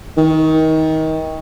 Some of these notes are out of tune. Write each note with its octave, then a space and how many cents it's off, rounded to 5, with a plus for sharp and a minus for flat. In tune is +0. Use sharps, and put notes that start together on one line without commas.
D#3 +25